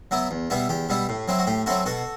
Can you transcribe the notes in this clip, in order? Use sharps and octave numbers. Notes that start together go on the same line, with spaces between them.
F#3 B3 E4
E2
B2 G3 B3 E4
E2 G4
B2 G3 B3 E4
A2
F#3 C4 E4
F#4
A2 G4
F#3 C4 E4 F#4 A4
B2 F#4 A4